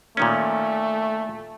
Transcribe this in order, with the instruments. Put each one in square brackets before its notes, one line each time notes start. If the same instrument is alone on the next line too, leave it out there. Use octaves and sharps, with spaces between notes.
[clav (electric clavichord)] A#2 D#3 C#4 [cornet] A3